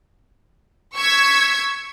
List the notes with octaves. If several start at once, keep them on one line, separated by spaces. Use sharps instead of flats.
C#6 E6 G#6 B6